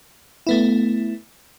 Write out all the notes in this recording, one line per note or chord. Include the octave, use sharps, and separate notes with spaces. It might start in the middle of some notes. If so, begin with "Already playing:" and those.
A3 B3 E4